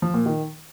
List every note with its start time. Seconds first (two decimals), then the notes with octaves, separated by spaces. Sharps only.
0.02 F3
0.14 A#2
0.26 D#3